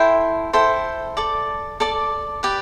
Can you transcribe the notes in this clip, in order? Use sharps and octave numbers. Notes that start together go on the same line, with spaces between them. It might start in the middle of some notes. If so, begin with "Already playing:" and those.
Already playing: E4 A4 C5 G5
E4 A4 C5 G5
A4 D5 A5 D6
A4 D5 A5 D6
G4 B4 D5